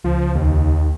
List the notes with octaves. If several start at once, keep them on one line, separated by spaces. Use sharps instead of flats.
C#2 F3
D#2